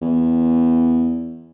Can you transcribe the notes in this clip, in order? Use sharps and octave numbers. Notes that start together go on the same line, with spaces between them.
E2